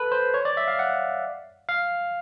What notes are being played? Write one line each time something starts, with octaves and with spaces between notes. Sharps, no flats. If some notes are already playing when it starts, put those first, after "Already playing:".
Already playing: A4 B4
C5
C#5
D5
E5
F5
F#5
F5